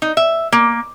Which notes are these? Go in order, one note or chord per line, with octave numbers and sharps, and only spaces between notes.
D#4
E5
A#3